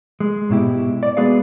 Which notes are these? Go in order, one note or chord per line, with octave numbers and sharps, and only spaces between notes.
G#3
G#2 B2 E4 G4
D5
G#3 B3 F#4 G#4 B4 F5